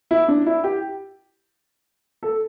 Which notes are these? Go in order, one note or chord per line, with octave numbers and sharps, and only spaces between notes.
E4
D4
E4
G4
A4